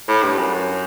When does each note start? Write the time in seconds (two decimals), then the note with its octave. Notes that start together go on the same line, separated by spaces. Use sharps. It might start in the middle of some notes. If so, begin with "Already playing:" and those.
0.08 A2
0.23 G2
0.39 F#2